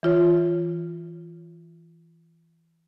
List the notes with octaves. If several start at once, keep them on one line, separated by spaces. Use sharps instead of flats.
E3 F4 C#5